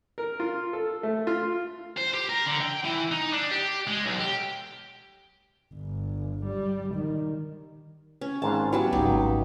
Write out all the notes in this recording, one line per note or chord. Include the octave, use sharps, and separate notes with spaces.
A#4
F4
A4
A3
F4
C5
G4
A#4
D3
G5
E3
D#4
D4
G4
G#3
B1
G4
G1
G3
D#3
C#4
G#1 G#2 F4 A5
F#3 G3 B3 A5
G#1 F3 F#3 D#4 G4
C#2